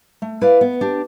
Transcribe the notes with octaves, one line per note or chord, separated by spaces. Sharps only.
A3
E4 B4 D5 F5
B3
D4 G4